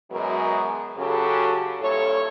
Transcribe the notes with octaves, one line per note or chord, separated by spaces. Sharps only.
F#2 B2 E3 F#3 G#3 A#4
C#3 F#3 C#4 F#4 G4 A4
G2 A#2 E4 A4 C#5